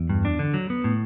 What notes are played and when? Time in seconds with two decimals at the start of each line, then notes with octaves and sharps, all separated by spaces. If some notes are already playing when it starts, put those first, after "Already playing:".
Already playing: E2
0.09 G2
0.25 D4
0.39 D3
0.54 F#3
0.70 B3
0.84 A2